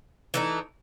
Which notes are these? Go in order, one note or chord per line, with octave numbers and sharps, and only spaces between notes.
E3 A3 D#4